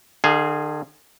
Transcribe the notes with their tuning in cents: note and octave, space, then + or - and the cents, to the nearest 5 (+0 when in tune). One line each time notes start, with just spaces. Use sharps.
D3 +45 G#4 +0 F5 +0